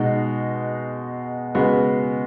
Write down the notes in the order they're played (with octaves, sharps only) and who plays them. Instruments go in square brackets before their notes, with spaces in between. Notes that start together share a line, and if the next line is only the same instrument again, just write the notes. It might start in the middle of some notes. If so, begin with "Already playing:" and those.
Already playing: [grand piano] B2 G#3 D#4 F#4
C#3 G#3 B3 F#4